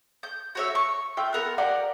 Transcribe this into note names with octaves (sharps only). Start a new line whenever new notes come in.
G6
F#4 C#5 E5
C#6
F4 E5 G5
B3 A#4 F#5 F#6
G4 A#4 D5 F#5